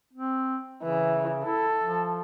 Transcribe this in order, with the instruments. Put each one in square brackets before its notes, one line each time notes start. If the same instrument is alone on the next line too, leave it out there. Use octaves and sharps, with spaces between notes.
[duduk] C4
[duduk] C#3 [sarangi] E3
[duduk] E4 [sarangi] A4
[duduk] F3